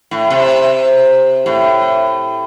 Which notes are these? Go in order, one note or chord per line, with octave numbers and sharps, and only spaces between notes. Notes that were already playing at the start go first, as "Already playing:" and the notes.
A2
C3
A2